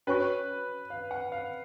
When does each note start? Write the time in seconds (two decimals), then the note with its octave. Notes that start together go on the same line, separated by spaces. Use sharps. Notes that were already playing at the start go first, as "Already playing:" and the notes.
0.07 C#4 F#4 B4 C#5 G#5 C#6
0.90 F5
1.11 F#5
1.32 F5